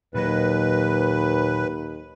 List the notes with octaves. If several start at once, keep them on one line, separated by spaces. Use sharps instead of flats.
D#2 A#2 F#3 B4 D#5